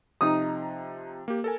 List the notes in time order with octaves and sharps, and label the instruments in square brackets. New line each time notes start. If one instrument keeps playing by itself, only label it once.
[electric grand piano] C3 F3 A#5 [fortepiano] D#4 D#6
[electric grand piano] A#3 G4
A4 A#4 G#5